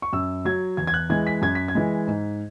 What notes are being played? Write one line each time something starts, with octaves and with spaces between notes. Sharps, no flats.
C#6
F#2 E6
F#3 G#6
E2 G#6
G#6
F#6
E3 G#3 G#6
B6
F#2 G#6
B6
G#6
E3 G#3
G#2